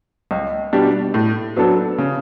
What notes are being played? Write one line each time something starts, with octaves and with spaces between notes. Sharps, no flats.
C#2
B2 G3 D4 G4
A2
F#3 B3 D4 A4
C#3